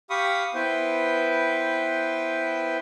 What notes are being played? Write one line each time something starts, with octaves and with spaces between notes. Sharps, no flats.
G4 F5 B5 C#6 D#6
B3 E4 B4 C5 G5